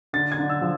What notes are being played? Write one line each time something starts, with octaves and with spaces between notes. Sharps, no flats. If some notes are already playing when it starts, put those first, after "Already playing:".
D3 A6
G#6
D3
E6
F3